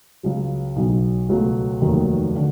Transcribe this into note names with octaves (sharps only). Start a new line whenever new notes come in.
C#2 C#3 F#3
B1 B2 F#3
C#2 B2 F#3 A3
F1 D#2 D#3 F#3
D3